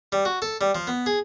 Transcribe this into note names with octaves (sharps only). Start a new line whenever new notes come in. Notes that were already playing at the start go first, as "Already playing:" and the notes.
G3
F#4
A4
G3
F3
B3
G#4